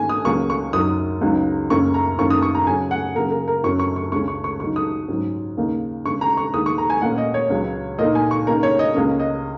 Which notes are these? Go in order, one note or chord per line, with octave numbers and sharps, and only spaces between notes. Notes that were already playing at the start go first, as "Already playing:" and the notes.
Already playing: G#2 D#3 A#3 C#4 G#5
D#6
C#2 C#3 F#3 A#3 C#6
C#6
F#2 F#3 D#4 D#6
C#2 C#3 F#3 D#4
F#2 C#3 A#3 C#4 C#6
A#5
F#2 D#3 A#3 C#4 C#6
D#6
C#6
A#5
C#3 F#3 C#4 G#5
F#5
C#3 F#3 A#3 A#4
A#4
A#4
F#2 F#3 C#4 C#6
C#6
C#6
C#2 C#3 G#3 C#4 C#6
C#6
C#6
C#3 F#3 D#4 C#6
D#6
G#2 F#3 C#4
D#2 C#3 A#3 D#4
C#3 G#3 C#4 C#6
A#5
C#6
D#2 D#3 G#3 D#6
C#6
A#5
G#5
A#2 A#3 C#4 F#5
D#5
C#5
C#2 C#3 F#3
A#2 A#3 D#4 D#5
G#5
C#6
C#3 A#3 D#4 A#4
C#5
D#5
C#2 C#3 A#3 C#4
D#5